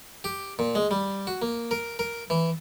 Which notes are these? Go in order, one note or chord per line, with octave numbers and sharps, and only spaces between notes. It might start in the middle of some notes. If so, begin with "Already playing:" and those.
G4
A#2
G#3
G3
F#4
A#3
A#4
A#4
E3